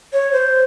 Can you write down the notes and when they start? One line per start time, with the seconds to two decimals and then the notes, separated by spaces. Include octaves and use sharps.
0.13 C#5
0.32 C5